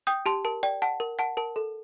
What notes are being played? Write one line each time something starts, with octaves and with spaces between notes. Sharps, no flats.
G5 D#6 G6
G4 A5 C6
A#4 A5
D5 G5
F#5 A5
A#4
F#5 A5
A#4 A5
A4